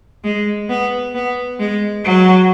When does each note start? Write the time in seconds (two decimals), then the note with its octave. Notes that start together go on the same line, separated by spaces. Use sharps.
0.24 G#3
0.69 B3
1.15 B3
1.59 G#3
2.05 F#3